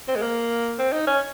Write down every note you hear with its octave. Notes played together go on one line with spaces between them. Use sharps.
C4
G#3
A#3
C4
D#4
C#4